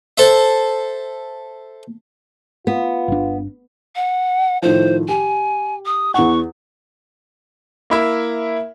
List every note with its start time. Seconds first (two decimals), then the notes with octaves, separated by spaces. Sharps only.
0.18 A4 C5 E5
2.67 B3 F4
3.08 G1 D4
3.95 F#5
4.62 A2 D#3 F3 C5
5.08 G4 G#5
5.86 D#6
6.14 E2 F#5 C#6
7.90 A#3 E4 E5